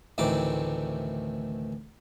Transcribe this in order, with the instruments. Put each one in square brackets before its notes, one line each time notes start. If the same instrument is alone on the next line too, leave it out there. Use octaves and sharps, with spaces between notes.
[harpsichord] D2 A2 D#3 E3 C4 D6